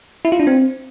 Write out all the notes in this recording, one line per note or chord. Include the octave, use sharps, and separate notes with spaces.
E4
F4
D4
C4